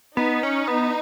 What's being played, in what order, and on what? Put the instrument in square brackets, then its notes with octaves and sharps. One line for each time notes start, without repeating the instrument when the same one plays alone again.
[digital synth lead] B3 [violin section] D#4
[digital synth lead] C#4
B3